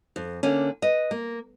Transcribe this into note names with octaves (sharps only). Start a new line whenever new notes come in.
F2
D3 A#3 C#4
B4 D#5
A#3